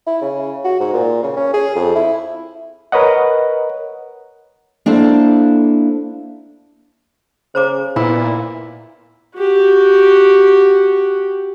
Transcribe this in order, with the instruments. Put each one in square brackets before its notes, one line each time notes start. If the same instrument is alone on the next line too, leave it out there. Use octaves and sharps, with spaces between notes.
[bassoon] E4
C#3
F#4
G#2
A#2
C#3
C#4
G#4
F2
E4
[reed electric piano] A#4 B4 C#5 D#5 F#5
[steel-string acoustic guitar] A#3 D4 E4 A4 C5
[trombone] C#3 [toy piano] C5 A#5 D6
[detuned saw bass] A#2 [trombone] B3 [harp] E4
[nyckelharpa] F#4 G4